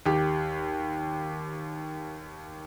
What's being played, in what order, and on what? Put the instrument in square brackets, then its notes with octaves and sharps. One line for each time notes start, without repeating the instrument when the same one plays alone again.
[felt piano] D#2 G4